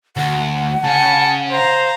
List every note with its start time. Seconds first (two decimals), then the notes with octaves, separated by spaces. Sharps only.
0.17 D2 F#5
0.84 C#3 G#5 A5 C#7
1.51 C5 F5 A#5